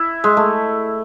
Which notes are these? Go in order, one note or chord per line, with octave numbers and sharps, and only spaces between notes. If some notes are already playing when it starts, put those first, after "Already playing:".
Already playing: E4
G#3
A3